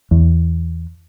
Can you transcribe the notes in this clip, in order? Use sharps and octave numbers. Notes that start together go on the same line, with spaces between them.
E2